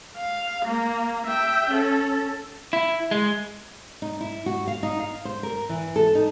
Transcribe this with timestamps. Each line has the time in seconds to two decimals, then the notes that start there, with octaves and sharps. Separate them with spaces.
0.16 F5
0.65 A#3
1.27 E5 G5
1.70 C#4 A4
2.73 E4
3.11 G#3
4.02 D#4
4.21 E4
4.46 F#4
4.67 F5
4.83 D#4
5.00 F5
5.25 C5
5.43 A#4
5.69 E3
5.96 A4
6.15 D#4